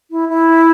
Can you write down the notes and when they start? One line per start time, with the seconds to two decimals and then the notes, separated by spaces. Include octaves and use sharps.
0.11 E4
0.29 E4